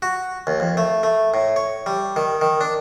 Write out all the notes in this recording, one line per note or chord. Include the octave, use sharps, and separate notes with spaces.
F#4
D#2
F2
A3
A3
A2
C#5
G3
D#3
D#3
D4